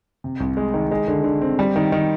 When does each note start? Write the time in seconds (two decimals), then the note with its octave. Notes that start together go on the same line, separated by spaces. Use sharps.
0.24 C3
0.40 C2
0.57 G#3
0.74 D#3
0.91 G#3
1.08 D3
1.24 D3
1.41 C4
1.59 G3
1.76 D#3
1.92 D#3